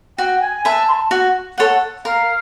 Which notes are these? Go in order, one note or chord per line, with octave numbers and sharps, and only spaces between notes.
F#4 G5
G#5
B4 E5 G#5 A5
C6
A5
F#4
A4 C#5 F#5
A#4 F5